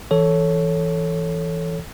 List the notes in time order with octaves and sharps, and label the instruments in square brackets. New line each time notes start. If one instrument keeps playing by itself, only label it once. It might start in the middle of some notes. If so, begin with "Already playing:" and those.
[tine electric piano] E3 A4 C#5